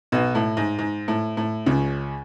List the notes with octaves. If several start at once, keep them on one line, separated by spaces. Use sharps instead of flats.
B1 B2
A2
G#2
G#2
A2
A2
C#2 C#3